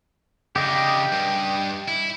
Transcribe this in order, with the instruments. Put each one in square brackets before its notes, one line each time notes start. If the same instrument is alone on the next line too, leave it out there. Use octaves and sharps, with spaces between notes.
[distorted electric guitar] C#3 D4 [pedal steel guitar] G4 D#5
[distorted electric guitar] G2
E4